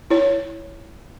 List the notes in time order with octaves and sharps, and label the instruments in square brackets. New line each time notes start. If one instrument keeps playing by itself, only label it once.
[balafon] E4 C#5